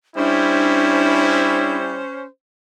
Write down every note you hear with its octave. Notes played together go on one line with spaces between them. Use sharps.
G3 C#4 D4 E4 C5